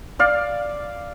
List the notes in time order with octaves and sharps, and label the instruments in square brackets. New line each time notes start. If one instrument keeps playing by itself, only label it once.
[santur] D5 F5